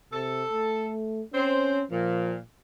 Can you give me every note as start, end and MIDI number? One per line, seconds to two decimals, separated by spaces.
0.12 0.44 48
0.12 0.92 69
0.49 1.22 57
1.34 1.81 60
1.34 1.85 61
1.34 1.81 72
1.91 2.38 46
1.91 2.37 53